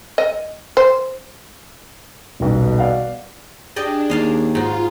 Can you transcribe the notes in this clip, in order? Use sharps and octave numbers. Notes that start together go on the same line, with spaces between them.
D#5
C5
D#1 B1 B2
D5 F5 F#5
D4 G4 G#4 D5 D#5
D#2 D#5 F5 A5
G#2 F4 F#4